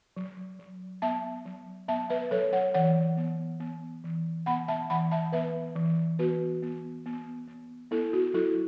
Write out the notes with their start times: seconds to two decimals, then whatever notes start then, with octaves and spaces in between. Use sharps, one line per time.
0.17 F#3
0.59 F#3
1.02 B3 E5 A5
1.45 F#3
1.88 B3 E5 A5
2.10 B4 E5
2.31 F#3 A4 C#5
2.53 C#5 F#5
2.74 E3 C#5 F#5
3.17 B3
3.60 B3
4.04 E3
4.46 B3 F#5 B5
4.68 E5 A5
4.90 E3 F#5 B5
5.11 E5 A5
5.32 B3 B4 E5
5.76 E3
6.19 B3 F#4 B4
6.63 B3
7.06 B3
7.48 B3
7.91 B3 E4 A4
8.13 F#4
8.34 F#3 E4 A4